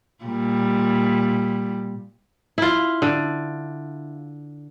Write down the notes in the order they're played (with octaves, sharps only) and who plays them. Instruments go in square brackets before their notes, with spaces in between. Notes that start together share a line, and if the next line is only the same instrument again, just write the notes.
[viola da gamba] A#2 G3
[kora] E4 F4
D3